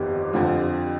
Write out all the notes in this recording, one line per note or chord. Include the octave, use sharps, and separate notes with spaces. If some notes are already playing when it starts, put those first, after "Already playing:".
Already playing: G1 F2 D#3 B3 G4
F2 D3 F3